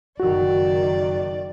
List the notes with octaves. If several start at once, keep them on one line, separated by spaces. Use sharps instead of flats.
F#1 D#3 F#4 D5